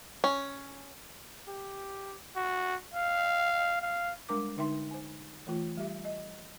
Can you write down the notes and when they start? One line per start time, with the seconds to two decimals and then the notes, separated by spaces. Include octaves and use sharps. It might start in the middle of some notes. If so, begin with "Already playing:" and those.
0.24 C#4
1.48 G4
2.36 F#4
2.94 F5
3.82 F5
4.29 G3 G#3 D4 A#4 D6
4.57 D3 G#3 D#4 E5 G5 C6
4.91 C5 G#5
5.47 E3 A3 F4
5.77 G3 G4 E5
6.05 D#5